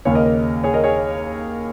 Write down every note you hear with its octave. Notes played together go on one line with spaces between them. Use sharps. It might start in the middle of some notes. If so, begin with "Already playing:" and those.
D#2 C#3 A#3 G#4 C#5
A#4 D#5
A#4
G#4 C#5
A#4 D#5
G#4 C#5